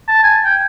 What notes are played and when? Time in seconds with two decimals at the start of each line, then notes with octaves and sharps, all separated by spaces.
0.08 A5
0.24 G#5
0.45 G5